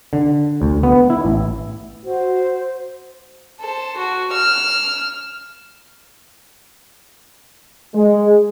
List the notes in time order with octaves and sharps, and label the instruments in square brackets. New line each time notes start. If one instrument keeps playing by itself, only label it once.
[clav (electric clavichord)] D3
D2
B3
E4
A1
[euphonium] F#4 [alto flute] C5
[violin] A4 C5
F#4
E6 F6
[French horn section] G#3